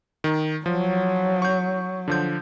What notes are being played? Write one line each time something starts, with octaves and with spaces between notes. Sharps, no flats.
D#3
F3 F#3
C#6 G6
D3 F3 G6